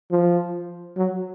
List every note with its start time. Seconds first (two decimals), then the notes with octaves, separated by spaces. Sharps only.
0.11 F3
0.97 F#3